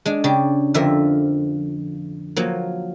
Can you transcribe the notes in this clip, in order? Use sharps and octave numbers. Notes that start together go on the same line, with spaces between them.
G#3 D4
C#3 D4 G4
F2 D3 F3 A#4 E5
F3 F#3 A#3